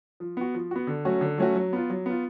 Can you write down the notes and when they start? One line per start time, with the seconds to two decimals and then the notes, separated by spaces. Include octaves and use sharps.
0.20 F3
0.37 B3 F#4
0.55 F3
0.71 B3 F#4
0.87 D3
1.05 F#3 A3 C#4 F#4
1.21 D3
1.38 F#3 A3 C#4 F#4
1.55 F#3
1.73 B3 F4
1.90 F#3
2.06 B3 F4